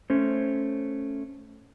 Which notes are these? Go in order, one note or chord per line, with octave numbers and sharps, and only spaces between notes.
A3 C#4 C5